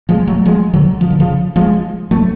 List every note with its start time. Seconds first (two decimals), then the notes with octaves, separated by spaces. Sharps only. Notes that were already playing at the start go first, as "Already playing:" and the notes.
0.09 F3 G#3
0.27 F#3 A3
0.45 F3 G#3
0.73 D3 F#3
1.01 F3
1.10 D3
1.20 C#3 F3
1.56 F3 G#3
2.11 F#3 A3